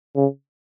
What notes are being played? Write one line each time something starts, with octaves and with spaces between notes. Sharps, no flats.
C#3